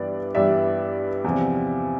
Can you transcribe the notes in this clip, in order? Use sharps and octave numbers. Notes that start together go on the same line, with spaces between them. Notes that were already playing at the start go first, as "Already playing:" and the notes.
Already playing: G2 E3 G3 B3 D5
G2 E3 G3 B3 D5 E5
E2 C3 F3